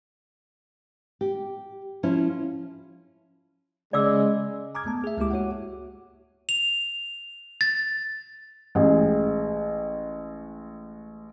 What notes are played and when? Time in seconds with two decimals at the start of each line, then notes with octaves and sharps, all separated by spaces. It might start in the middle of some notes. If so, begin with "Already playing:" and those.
1.21 G4
2.03 F3 C#4 E4
3.93 C#3 G#3 D5 D6 E6
4.75 G#5 A#5 D6 D#6 F6 G#6
4.86 A3 B3 A5
5.04 G#4 E5
5.17 C#2 G#3 A#3 E4 G4 D6
5.31 F#4 C#5 E5 F#5
6.49 F7
7.61 A6
8.75 A1 G#3 G#4